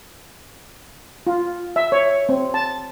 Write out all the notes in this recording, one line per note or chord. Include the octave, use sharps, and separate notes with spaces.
F4
E5
C#5
C4
A5